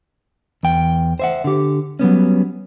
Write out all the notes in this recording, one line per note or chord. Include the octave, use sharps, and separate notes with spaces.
E2 G5
C5 E5 F#5
D3 G4
F#3 G3 B3 C#4